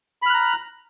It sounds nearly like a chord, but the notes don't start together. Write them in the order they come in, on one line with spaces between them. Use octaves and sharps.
B5 F6 F#6 A#5